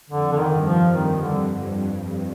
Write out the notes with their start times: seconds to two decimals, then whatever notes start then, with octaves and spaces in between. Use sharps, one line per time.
0.10 F2 D3
0.33 D3
0.38 D#3
0.51 G2
0.65 F3
0.92 D#3
1.20 D3